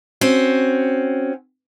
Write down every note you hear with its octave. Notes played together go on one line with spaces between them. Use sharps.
C4 C#4 F#4